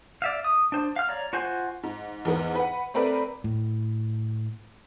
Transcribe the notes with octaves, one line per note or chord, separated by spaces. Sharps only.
D5 E5 F5
D#6
D4 C5
F5 F6
C#5 D5 A#5
F4 F#4 C5 G#5 G6
G#2
E2 G#2 B3
B4 F#5
A3 C4 A#4 B4 D5
A2